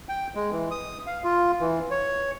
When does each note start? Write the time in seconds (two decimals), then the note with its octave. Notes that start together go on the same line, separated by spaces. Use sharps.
0.09 G5
0.35 G#3
0.51 E3
0.71 D#6
1.07 F5
1.24 F4
1.61 E3
1.91 C#5